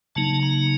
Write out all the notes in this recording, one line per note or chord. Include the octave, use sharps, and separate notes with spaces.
C#3 F#3 A#3 D#4 A5
A#5